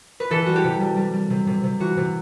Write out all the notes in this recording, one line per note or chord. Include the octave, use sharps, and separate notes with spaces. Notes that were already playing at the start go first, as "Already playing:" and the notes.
B4
E3 A4
G3 F#4
G4
C3
G3
G3
G3
C3
C3
C3
E3 F#4
C3